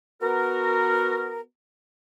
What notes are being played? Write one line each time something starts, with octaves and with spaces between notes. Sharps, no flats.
B3 F#4 A#4